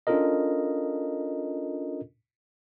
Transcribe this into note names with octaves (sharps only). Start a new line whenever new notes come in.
C#4 D4 F4 A4 A#4 D#5